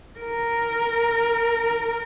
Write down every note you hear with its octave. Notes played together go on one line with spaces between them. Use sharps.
A#4